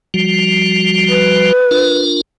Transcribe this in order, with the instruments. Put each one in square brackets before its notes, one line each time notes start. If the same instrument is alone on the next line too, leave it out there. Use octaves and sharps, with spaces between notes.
[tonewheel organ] F3 G3 F#4
[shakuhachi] B4
[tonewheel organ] D4 F4 A#4